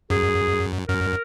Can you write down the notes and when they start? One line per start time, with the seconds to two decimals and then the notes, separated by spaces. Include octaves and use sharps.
0.10 F#2 G#4
0.88 F#2 A#4